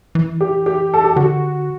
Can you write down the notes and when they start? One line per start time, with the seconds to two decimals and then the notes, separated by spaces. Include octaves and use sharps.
0.15 E3
0.41 G4
0.66 G4
0.94 A4
1.04 G4
1.16 D3 F#4